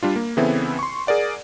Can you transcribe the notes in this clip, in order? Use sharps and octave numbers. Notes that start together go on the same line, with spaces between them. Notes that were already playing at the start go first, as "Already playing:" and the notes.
G3 D4 F4
A#3
C#3 E3 B3 C4 E4 A4
C6 C#6
G#4 A#4 D5 F#5